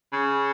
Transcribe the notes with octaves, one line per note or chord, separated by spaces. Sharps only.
C#3